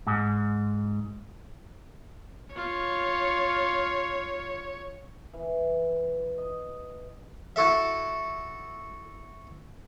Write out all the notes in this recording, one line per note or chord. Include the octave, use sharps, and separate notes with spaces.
G#2
F4 C#5
E3
D#5
E4 F#4 A4 E5